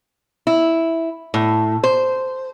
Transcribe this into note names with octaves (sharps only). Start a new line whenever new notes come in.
E4
A2
C5